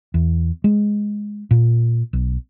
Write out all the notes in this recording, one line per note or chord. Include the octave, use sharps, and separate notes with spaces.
E2
G#3
A#2
B1